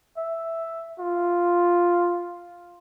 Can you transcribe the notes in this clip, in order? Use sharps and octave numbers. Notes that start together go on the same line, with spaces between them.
E5
F4